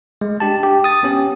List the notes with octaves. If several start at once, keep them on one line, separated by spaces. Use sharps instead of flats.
G#3
D4 G4 A5
G4
D#6 A6
B3 C#4 G4